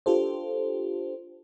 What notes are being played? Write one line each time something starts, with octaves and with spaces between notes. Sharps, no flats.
D4 F4 G4 A4 C5